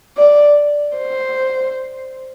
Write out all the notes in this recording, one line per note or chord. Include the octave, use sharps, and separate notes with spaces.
D5
C5